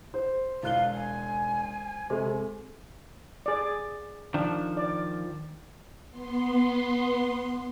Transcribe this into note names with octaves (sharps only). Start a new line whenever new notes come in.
C5
E1 E4 F5 F#6 G7
G#5
C3 G#3 G4 A4 C5
G#4 D5
D#3 F3 D4
D5
B3 C6